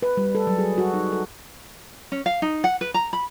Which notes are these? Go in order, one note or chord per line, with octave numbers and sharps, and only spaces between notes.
B4
G3
A4
F#3
G#4
F#4
D#4
A4
C#4
F5
D#4
F#5
B4
A#5
B5